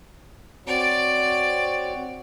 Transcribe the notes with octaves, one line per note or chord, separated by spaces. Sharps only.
C4 F#4 C#5 D5